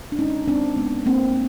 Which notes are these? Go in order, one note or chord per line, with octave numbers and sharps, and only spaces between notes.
D4
G#3 C#4 D#4
G#3 C4 D4
G#3 B3
G#3 A#3 C4